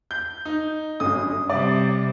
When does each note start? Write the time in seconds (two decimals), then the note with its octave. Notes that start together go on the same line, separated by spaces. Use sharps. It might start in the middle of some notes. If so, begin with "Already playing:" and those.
0.11 G6
0.45 D#4
1.00 G1 F#2 F#3 D#6
1.50 C3 G3 D5 D6